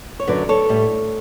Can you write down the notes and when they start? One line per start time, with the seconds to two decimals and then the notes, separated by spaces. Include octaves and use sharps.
0.20 C#5
0.27 F#2 D3 F#3 B4 D5
0.49 A4 C#5
0.69 A2 G3